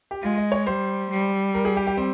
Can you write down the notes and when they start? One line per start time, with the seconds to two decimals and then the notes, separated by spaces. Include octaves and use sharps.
0.11 G4
0.22 G#3 F4
0.38 D#5
0.52 C#5
0.66 G3 C5
1.10 G3
1.54 A#4
1.65 G#4
1.77 G4
1.87 G4
1.97 C4